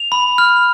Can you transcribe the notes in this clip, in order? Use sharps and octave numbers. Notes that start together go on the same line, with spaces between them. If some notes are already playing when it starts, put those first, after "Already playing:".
Already playing: F7
B5
F6